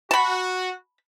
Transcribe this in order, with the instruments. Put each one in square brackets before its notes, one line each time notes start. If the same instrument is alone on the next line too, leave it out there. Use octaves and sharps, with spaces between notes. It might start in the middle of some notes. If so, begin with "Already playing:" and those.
[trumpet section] F#4 [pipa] A5 B5